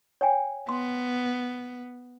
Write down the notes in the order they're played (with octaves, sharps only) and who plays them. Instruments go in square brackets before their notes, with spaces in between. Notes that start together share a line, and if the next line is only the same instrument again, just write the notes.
[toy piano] C#5 G5 G#5
[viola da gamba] B3 [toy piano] C6